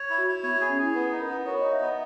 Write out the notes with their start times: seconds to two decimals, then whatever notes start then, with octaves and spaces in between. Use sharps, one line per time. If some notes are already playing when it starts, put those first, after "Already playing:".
Already playing: C#5
0.10 E4
0.18 F#4
0.27 E4
0.43 B3 C#5
0.57 B3 G#4
0.69 C#4
0.78 E4 G#4
0.95 B3 B4
1.12 D#4
1.20 A#4
1.29 B3
1.46 F#4 C#5
1.59 D#4 D#5
1.72 E5
1.81 B3 D#5